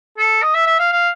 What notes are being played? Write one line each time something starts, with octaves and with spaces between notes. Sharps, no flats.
A4
D#5
E5
E5
F5
F5